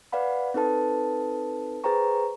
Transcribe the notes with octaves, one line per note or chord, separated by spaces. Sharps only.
B4 D5 F5 F#5 B5
C4 D#4 A4 B4 A5
G#4 B4 C5 G5 A#5 C#6